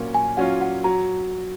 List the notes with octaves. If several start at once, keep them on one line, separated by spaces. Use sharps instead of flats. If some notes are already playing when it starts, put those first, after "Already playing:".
Already playing: A#2 F#3 C#4 F4
G#5
F#3 C#4 F4 F#5
F#5
F#3 A#5